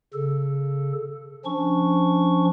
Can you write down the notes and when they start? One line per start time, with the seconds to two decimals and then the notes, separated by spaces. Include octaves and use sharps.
0.14 C#3 A4
1.45 F3 C#4 D4 C#6